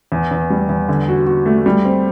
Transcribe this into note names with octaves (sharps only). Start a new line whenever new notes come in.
E2
E2
G3
E2
D3
F#4
F#4
A3
G3
C4